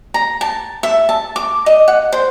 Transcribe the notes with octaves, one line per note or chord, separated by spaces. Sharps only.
A#5
A5
E5
A5
D6
D#5
F#5
C5